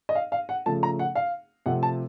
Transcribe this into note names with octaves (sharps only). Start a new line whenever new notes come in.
D#5
F5
F5
F#5
C#3 F3 A3 A5
A#5
F#5
F5
C3 F3 A3 C4 F#5
A5